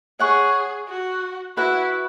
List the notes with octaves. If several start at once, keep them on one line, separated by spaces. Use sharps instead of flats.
G#4 C#5 F#5 C#6
F#4
E4 F#4 B4 F#5